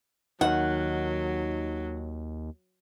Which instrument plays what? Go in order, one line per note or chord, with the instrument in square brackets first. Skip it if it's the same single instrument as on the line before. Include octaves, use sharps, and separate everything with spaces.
[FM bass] D#2 [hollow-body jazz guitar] D#3 [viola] F#3 [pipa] F#5